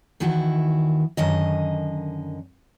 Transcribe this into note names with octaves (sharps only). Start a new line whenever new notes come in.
D#2 D#3 E3 E4 F#4
F#2 D3 D#3 D#5